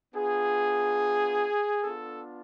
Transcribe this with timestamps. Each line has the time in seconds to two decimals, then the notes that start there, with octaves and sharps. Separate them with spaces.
0.14 B3 D4 F4 G#4
1.83 B3 D4 F4 A4